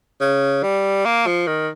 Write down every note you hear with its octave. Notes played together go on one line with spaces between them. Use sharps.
C#3
G3
A#3
F3
D#3